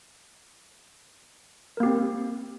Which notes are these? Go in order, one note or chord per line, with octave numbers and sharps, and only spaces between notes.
A#3 C4 G4 A#4